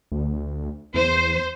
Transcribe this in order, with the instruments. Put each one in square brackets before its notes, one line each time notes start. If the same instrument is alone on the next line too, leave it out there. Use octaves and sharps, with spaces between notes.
[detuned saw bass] D2
[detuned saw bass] E2 [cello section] C5